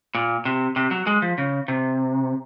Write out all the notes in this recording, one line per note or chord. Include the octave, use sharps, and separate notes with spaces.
A#2
C3
C3
F#3
G#3
F3
C#3
C3